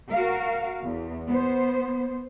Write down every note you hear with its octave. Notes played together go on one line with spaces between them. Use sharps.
F#4 A#4 F5
E2
B3 C5